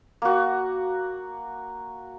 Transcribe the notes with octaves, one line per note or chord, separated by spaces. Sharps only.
A#3 F#4